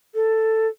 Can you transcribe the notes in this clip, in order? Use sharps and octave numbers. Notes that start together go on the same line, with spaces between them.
A4